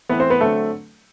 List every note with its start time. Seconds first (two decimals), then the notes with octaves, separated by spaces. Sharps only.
0.09 E3 A3 B3 C4 B4
0.20 C4 C5
0.30 B3 B4
0.41 D3 F#3 A3 C4 A4